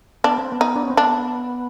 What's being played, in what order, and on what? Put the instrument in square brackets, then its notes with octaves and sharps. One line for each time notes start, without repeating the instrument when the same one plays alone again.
[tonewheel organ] B3 [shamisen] D4
[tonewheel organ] C4
B3
[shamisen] D#4
[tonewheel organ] D4
C#4
C4
[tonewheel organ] B3 [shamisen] D4